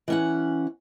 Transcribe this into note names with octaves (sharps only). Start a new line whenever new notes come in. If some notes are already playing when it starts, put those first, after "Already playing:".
E3 C#4 F#5